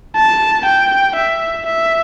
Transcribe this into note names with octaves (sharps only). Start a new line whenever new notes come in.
A5
G5
E5
E5